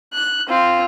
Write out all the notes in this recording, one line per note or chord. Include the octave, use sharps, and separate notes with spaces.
F#6
C4 F4